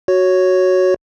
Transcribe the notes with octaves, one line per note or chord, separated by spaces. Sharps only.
F#4 C#5